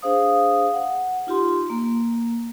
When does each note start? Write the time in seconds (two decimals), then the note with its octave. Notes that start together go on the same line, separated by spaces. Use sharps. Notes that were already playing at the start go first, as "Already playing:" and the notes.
0.02 D4 G#4 C5 F5 D#6
0.73 F#5
1.27 D#4 F4 G4 C6
1.70 A#3